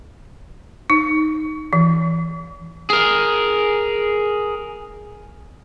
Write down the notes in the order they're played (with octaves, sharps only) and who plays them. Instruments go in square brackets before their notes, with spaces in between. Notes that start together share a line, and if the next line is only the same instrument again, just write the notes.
[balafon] D#4
E3
[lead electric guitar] G#4 A#4